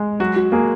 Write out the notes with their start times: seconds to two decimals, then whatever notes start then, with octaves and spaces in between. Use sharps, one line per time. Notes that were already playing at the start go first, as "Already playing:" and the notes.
Already playing: G#3
0.20 F#3 F#4
0.36 F#4
0.52 A#3 G#4